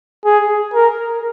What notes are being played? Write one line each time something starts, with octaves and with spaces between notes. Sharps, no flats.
G#4
A#4